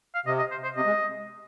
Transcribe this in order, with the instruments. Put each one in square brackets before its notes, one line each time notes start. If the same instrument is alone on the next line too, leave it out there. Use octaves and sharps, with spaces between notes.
[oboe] F5
[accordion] C3 [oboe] D#5
[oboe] D#5
C5
C5
[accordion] C3 [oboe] D#5
[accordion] G#3